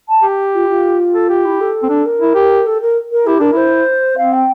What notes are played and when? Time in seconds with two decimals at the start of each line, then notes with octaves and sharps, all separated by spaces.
0.08 A5
0.23 G4
0.53 F4
0.69 F4
1.14 A4
1.29 G4
1.44 E4
1.60 A4
1.83 C4
1.90 D4
2.05 A#4
2.21 E4
2.35 G4
2.66 A4
2.81 A#4
3.11 A#4
3.26 E4 G4
3.40 D4 A#4
3.53 E4 C5
4.17 C4 F5
4.32 G5